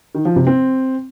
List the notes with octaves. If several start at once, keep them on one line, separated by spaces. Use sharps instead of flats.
D#3
F3
C3
C4